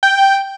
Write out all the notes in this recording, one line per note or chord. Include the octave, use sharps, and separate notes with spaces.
G5